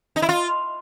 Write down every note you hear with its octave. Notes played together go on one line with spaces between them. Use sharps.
D#4
E4
F4